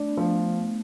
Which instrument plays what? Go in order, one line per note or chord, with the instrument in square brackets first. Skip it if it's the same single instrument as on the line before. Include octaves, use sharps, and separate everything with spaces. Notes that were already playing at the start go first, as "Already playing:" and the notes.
Already playing: [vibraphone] A3 [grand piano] D4
[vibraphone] B3
[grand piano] F3 [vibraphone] A3